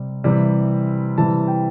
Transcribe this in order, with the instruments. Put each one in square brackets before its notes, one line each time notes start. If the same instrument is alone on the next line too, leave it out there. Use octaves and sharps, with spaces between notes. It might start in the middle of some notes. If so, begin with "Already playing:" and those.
Already playing: [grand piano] C3 G3
C3 E3 G3
C3 E3 G3 A5
G5